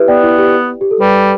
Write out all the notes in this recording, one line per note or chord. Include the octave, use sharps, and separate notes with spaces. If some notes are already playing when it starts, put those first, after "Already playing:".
Already playing: E4 G4 B4 E5
B3 D5 G5
E4
G4
G4
A4
G3 B4